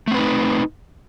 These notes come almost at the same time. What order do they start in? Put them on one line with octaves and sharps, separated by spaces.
A3 C4 B4 D#4